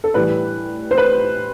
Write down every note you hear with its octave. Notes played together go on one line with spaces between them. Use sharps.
A4
A2 E3 G3 B4
C5
B4